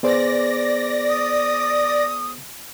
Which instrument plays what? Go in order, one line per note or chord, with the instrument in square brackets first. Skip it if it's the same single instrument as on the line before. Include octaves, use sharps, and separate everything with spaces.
[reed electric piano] B3 G#4 C5 [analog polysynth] D5 A#6
[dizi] D#6